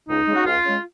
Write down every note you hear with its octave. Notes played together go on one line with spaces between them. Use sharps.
C#2 D#4
C#3 G#3
F#4
C#2 F4
C#3 G#3